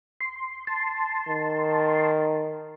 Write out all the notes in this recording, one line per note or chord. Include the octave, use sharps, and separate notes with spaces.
C6
A5 C6
D#3